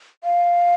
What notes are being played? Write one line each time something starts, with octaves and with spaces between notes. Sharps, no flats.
F5